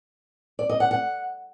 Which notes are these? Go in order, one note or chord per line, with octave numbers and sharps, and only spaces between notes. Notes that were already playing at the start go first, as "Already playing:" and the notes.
D5
D#5
F#5
F#5